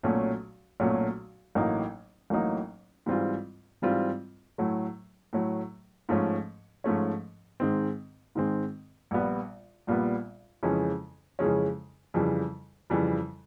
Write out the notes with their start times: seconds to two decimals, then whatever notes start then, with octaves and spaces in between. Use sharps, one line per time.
0.03 B1 A#2 F#3 A3 C#4
0.80 B1 A#2 F#3 A3 C#4
1.55 A1 A2 F#3 A#3 D#4
2.30 A1 A2 F#3 A#3 D#4
3.06 G#2 E3 G3 C4 F4
3.82 G#2 E3 G3 C4 F4
4.58 A2 F#3 A3
5.33 A2 F#3 A3
6.09 G#2 F3 A3 C#4
6.84 G#2 F3 A3 C#4
7.60 G#2 D#3 G#3 C4
8.35 G#2 D#3 G#3 C4
9.11 A#1 A#2 G3 B3
9.87 A#1 A#2 G3 B3
10.63 F2 C#3 E3 G#3 C#4
11.39 F2 C#3 E3 G#3 C#4
12.14 F2 C#3 E3 G3
12.90 F2 C#3 E3 G3